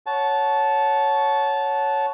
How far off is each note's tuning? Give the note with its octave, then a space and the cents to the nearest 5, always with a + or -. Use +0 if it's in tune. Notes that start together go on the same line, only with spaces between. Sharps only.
C#5 +0 F#5 +0 A5 -15